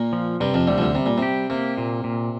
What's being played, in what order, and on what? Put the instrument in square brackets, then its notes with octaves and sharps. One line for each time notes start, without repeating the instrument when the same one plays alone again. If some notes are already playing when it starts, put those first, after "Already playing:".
Already playing: [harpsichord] A#2 A#3
[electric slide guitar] F3
[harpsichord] G2 G3 [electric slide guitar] C3
[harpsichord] F2 F3
[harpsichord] D2 D3 [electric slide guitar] G3
[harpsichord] F3
D2 D3
[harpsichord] C3 [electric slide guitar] G3
[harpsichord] A#2
[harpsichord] C3 [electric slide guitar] G4
[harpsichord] C3 [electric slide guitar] A#3
[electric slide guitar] A#2
A#2